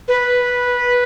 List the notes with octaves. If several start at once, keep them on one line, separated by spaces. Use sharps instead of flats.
B4